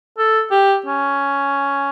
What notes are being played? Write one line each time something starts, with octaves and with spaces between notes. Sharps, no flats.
A4
G4
C#4